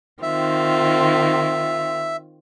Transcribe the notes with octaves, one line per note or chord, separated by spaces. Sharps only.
D#3 C4 F4 E5